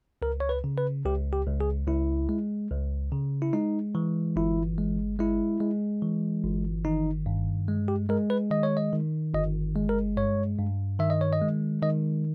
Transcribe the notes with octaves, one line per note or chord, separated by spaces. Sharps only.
C#2 A#4
C#5
B4
C#3
B4
C#2 G4
G4
C#2
G#4
C#2 E4
G#3
C#2
C#3
E4
G#3 D#4
E3
G1 E4
G#3
G#3 E4
G#3
E3
G1
D#3 D#4
G2
G#3
G4
G#3 A#4
B4
D#3 D#5
C#5
D#5
D#3
G1 D#5
G#3
A#4
G2 C#5
G2
D#3 E5
D#5
C#5
D#5
G#3
D#3 D#5